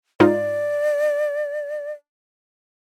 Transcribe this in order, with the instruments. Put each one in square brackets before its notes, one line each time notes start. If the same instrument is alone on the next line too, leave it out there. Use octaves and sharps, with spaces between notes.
[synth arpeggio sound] G#2 D#4 F4 [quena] D5